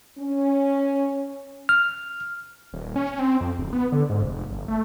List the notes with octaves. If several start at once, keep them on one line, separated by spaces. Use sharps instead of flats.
C#4
F6
D#1
C#4
C4
F2
D1
B3
D3
G#2
F1
G1
A3